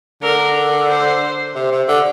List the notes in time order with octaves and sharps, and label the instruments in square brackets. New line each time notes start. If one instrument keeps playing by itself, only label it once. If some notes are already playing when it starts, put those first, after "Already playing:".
[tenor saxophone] D3 [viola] A#4
[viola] C5
[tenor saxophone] C3
C3
D3